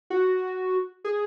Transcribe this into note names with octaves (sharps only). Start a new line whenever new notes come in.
F#4
G#4